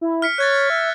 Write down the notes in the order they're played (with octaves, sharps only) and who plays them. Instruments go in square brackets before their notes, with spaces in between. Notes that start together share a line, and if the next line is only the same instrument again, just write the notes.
[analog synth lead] E4
[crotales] F6 B6 C#7
[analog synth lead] C#5 [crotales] F#6 G#6 A6
[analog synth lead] E5